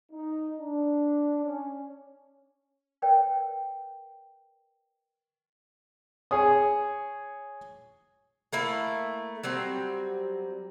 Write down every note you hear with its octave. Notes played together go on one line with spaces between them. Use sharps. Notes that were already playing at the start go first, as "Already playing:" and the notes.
D#4
D4
C#4
A#4 B4 C#5 D5 G5
G#4 C#5 D#6
A3 A#3 E4
F#3 G3 C4